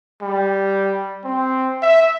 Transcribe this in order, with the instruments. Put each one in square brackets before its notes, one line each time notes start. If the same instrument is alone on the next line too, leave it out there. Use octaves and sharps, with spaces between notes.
[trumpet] G3
C4
E5